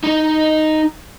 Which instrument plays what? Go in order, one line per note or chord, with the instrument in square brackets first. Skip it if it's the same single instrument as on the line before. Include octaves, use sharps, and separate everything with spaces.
[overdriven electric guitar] D#4 D#5